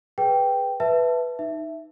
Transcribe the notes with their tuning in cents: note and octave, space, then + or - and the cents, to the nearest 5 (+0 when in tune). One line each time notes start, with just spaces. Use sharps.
G#4 +10 B4 +0 G5 +0
B4 +0 E5 +5 A5 +0
D#4 +0 E5 +0